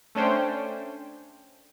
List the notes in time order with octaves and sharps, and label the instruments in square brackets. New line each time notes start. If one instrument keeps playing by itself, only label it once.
[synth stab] A3 C#4 D4 C5 G5